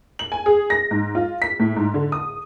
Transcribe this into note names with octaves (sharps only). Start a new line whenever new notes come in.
F#7
G#5
G#4
A#6
G#2
F4
B6
A2
G#2
D3
D#6